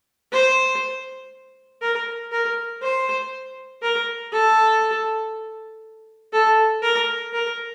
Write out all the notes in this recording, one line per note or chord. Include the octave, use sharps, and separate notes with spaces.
C5
A#4
A#4
C5
A#4
A4
A4
A#4
A#4